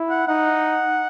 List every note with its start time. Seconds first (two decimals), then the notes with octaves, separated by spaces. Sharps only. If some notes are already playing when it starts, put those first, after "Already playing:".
Already playing: E4
0.10 F#5
0.28 D#4 F#5